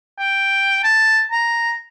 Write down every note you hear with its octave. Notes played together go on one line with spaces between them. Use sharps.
G5
A5
A#5